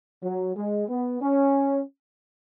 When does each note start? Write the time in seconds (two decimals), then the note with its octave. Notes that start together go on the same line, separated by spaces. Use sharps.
0.22 F#3
0.55 G#3
0.88 B3
1.21 C#4